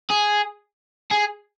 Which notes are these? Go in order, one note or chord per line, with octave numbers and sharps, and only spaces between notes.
G#4
G#4